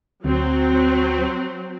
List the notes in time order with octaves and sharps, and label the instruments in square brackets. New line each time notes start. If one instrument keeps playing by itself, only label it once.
[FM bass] D2 [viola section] F#3 C4